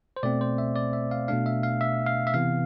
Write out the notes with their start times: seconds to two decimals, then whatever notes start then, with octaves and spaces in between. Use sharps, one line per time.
0.17 C5
0.23 B2 A3 C4 D5
0.41 C5
0.58 E5
0.76 D5
0.93 E5
1.11 F5
1.28 B2 A3 D4 F5
1.46 E5
1.63 F5
1.81 E5
2.07 F5
2.27 E5
2.34 C3 E3 B3 F5